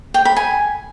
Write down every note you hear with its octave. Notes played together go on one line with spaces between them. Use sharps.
G5
B5
G#5